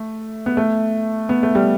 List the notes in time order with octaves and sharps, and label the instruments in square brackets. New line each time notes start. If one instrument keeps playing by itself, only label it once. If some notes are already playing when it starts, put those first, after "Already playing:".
Already playing: [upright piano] A3
B3
A3
B3
A3
G3